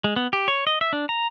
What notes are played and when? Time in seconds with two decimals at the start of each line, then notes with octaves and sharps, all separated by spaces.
0.04 G#3
0.16 B3
0.33 G4
0.48 C#5
0.67 D#5
0.81 E5
0.93 D4
1.09 A#5